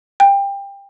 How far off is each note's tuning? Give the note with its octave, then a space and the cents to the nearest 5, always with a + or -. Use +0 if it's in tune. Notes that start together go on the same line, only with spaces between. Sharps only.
G5 +25